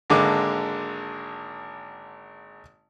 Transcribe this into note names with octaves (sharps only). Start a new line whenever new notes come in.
G#1 D3 G#3 A#3 D6